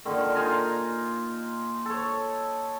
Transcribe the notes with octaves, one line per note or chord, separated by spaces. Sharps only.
A#2 D3 D#3
D#4 F4 G#5 A#5
A4 C#5